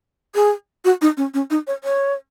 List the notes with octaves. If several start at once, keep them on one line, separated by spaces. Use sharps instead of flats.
G#4
F#4
D#4
C#4
C#4
D#4
C#5
C#5